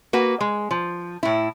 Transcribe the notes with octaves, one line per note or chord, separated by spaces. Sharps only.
A#3 F#4 B4
G#3
F3
A2 E4